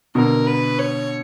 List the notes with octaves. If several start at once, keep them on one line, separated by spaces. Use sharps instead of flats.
B2 D3 A#4
B4
C#5